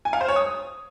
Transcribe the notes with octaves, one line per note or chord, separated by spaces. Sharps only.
G#5
F5
C5
C#5
D#6